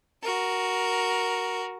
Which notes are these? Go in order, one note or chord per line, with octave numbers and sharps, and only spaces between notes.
F#4 A#4